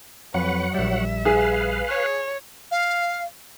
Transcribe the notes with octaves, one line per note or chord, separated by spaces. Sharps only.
F2 F#3 B4 F#5
A#1 G3 E5
G#4 B4 F5
C#5
F5